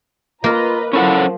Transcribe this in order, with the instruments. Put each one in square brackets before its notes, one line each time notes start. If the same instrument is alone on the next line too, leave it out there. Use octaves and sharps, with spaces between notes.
[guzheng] A#3 A#4 [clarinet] F4 [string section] B4 D#5 A#5
[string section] F3 F#3 [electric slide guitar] C#4 A4 F#5 [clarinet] E4